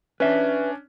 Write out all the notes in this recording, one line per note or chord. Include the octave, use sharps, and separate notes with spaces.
C#4 D4 B4 E5